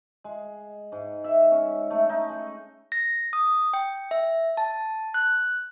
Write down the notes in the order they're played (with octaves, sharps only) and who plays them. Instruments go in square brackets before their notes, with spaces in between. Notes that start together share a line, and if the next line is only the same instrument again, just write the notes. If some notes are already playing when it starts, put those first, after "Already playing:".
[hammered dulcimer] G#3
G#2
E5
C#4
A3
D#4
G#3
[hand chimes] A#6
D#6
G5
E5
A5
F#6